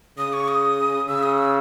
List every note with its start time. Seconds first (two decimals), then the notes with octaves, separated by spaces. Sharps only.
0.18 C#3 D#6
0.33 C#6
0.48 D#6
1.08 C#3 E6
1.23 D#6
1.38 E6